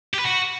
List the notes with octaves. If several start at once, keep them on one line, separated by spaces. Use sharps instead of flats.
G4
B4
F#4